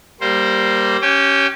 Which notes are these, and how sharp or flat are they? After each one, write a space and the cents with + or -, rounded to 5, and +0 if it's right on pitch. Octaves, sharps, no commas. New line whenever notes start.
G3 -15 A#3 +0 C5 +0
C#4 +0 G4 -25 G5 +25